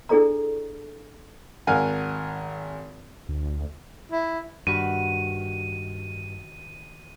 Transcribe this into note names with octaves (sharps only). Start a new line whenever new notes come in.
D4 E4 G#4 A4 D5 A#5
G#1 A#4 F5 F#5 G#5
D2
E4
G2 D#3 F#4 B4 D#7